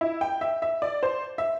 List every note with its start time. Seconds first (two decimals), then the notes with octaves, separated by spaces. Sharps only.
0.01 E4
0.21 G5
0.41 E5
0.62 E5
0.82 D5
1.03 C5
1.38 E5